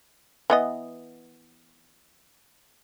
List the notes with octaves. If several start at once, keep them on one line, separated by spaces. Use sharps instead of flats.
E3 B3 D#5